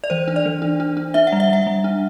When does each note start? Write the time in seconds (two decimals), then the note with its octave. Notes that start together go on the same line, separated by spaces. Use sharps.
0.04 D5
0.10 E3 C5
0.28 D4
0.36 D5
0.46 E3
0.62 D4
0.80 D4
0.97 D4
1.14 D4 E5
1.27 F#5
1.32 G3
1.40 E5
1.49 G3 F#5
1.67 G3
1.84 D4